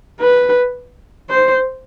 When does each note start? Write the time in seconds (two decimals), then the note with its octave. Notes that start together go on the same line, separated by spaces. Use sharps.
0.20 B4
1.30 C5